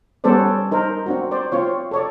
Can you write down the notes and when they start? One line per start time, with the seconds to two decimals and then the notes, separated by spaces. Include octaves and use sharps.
0.24 G3 B3 C#4 A4 C5 D5
0.71 D#4 A#4 C5
1.06 C4 D4 F#4
1.31 C5 D5
1.52 C4 F4 C#5
1.91 A4 C#5 D5